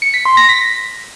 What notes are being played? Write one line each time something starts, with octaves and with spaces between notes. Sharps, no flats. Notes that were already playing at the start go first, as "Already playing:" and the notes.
C#7
B6
C6
A#6
B6